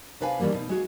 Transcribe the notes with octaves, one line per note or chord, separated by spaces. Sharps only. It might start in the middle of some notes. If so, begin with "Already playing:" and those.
C3 D4 B4 F5 G#5
D#3 E3 G3 G#3 A#3
B2 D#4
G#3 F#4 G#4